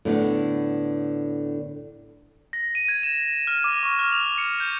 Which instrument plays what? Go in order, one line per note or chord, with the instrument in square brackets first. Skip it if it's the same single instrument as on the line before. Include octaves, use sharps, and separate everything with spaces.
[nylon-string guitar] A2 D3 B3
[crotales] A#6
D#7
G#6
E7
F6
D6
C#6
F6
F7
C#7
G6